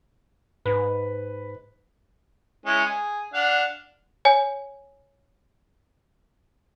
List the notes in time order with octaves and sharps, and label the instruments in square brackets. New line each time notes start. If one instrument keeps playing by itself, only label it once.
[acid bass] G#2 [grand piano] B4
[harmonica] G#3 C#4 E4
G#4
D4 F5 F#5
[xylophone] C#5 G#5